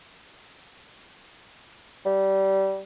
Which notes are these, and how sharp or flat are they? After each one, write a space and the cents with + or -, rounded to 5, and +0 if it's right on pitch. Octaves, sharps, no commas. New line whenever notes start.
G3 -20